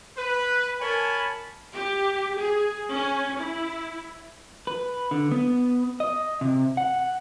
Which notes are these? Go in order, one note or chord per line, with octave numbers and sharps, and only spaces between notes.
B4
A#4 C#5 G#5 A5 B5
G4
G#4
C#4
E4
B4
D3
B3
D#5
C3
F#5